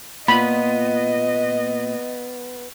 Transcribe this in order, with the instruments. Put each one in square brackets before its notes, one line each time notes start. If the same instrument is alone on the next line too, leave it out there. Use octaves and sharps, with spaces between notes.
[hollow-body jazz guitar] A#2 F4 [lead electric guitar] B3 [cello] D#5 [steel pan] B5